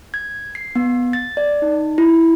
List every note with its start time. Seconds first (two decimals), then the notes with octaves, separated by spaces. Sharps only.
0.14 G#6
0.55 C7
0.75 B3
1.13 A6
1.37 D5
1.62 D#4
1.98 E4